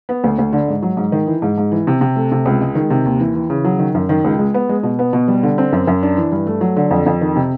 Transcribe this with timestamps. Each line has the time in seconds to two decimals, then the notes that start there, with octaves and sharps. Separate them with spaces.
0.09 B3
0.24 D2
0.39 D2
0.53 D3
0.68 G#2
0.82 F#3
0.97 G#2
1.12 D#3
1.27 E3
1.42 G#2
1.58 G#2
1.72 E3
1.87 C3
2.01 C3
2.16 A3
2.32 C3
2.46 C#2
2.61 G#3
2.75 D#3
2.90 C3
3.05 D#2
3.20 E3
3.35 E3
3.50 C#3
3.64 F#3
3.79 D#3
3.95 F#2
4.09 D#3
4.24 C#2
4.39 G#3
4.54 B3
4.69 G#3
4.83 B2
4.99 B3
5.13 B2
5.28 G3
5.43 D3
5.58 C4
5.73 F#2
5.87 F#2
6.03 D4
6.17 E3
6.32 G2
6.47 A3
6.61 F#3
6.76 D3
6.91 F2
7.06 F2
7.21 D#3
7.36 C3